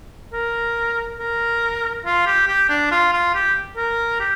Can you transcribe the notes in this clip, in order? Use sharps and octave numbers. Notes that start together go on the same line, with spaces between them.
A#4
A#4
F4
G4
G4
D4
F4
F4
G4
A#4
G4